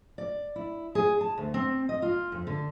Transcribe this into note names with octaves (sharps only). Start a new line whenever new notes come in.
D5
E4
G#4
A5
D2
C4
D#5
F4
F2
D3